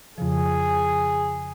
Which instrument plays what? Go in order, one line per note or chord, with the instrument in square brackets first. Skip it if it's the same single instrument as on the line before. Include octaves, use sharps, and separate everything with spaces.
[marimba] F2 C#3 F3 [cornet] G#4